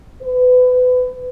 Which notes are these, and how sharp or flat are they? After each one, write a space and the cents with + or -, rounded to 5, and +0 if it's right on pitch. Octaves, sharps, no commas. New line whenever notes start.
B4 +30